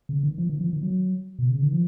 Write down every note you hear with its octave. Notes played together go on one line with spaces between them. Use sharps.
C#3
D#3
F3
D#3
F3
D#3
F#3
B2
C#3
D#3
F3